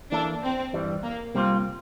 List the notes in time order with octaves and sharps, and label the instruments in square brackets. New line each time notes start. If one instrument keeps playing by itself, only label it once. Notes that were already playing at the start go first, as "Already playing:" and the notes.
[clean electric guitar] E3 A#3 E4 A4 [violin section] D4
[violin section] C4
[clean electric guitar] G2 E3 G3
[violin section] A#3
[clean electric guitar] C3 G3 A#3 F4 [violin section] C4